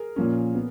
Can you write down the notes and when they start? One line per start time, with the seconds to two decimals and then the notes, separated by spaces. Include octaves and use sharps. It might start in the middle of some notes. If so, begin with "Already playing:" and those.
Already playing: G#4 A#4
0.16 A#2 F3 A#3 C#4
0.55 B3